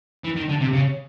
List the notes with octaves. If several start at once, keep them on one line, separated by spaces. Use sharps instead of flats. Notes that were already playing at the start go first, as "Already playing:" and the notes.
E3
D#3
D3
C3
C#3